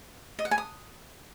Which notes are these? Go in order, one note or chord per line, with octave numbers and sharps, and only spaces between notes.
D#5
F#5
G#5
D#6